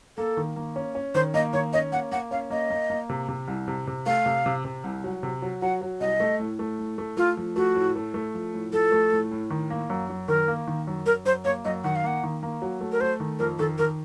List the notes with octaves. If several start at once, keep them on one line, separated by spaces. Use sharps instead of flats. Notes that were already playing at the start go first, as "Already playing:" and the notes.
A#3 A4
D#3
A#3
C#4
C#4
D#3 C5
A#3 D#5
D#3 C#5
C#4 D#5
A#3 F#5
A#3 F#5
C#4 F5
A#3 D#5
A#3
A#3
C3
C3
C2
C3
C3
A3 F5
C3
C3
C3
C2
F#3
C3
F#3
F#3 F#5
F#3
C2 D#5
A3
A2
A3
A2
A3
A3 F4
F3
A3 F#4
A2
A3
A3
F3
A2
F3 A4
A3
A2
A2
D#3
A#3
F#2
F#2
D#3 A#4
A#3
D#3
F#2
F#2 A#4
F#2 C5
A#3 C#5
F#2 D#5
D#3 F#5
F5
A#3 F#5
D#3
A#3
F#3
A3
A#4
A3 C5
D#3
F2 A#4
D#3 A4
D#3 A#4